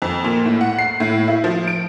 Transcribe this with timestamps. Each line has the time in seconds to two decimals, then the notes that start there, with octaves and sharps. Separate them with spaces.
0.02 F2
0.24 A#2
0.46 A2
0.61 F#5
0.79 C7
1.00 A2
1.28 E4
1.44 F3
1.67 D7